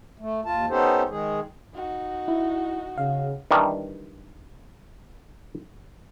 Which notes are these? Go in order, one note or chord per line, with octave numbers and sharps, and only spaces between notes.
A3
D#2 F4 A5
B3 C#4 D#4 G4 A4 C5
D#3 G#3 G#4
D#4 F#4
E4
C#3 F5
D#3 E3 G3 D4